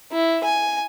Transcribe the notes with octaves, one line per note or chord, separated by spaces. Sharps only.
E4
G#5